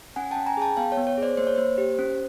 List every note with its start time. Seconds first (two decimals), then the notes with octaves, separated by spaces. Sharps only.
0.16 C#4 F#5 G#5
0.31 C#4 G5 A5
0.46 G#5 A#5
0.57 G#4 G5 A5
0.77 B3 F5 G5
0.92 C#5
0.97 B3
1.07 C#5
1.18 G#4 C5 D5
1.37 A#3 C5
1.47 C#5
1.56 A#3 C5
1.78 G4
1.99 C#4